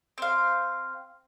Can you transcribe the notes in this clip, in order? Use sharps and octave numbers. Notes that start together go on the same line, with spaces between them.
C4 F5